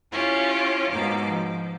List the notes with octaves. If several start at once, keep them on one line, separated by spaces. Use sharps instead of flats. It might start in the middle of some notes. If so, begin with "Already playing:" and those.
C#4 E4 F4 G4 C#5
G#2 B2 A#3 D6
F3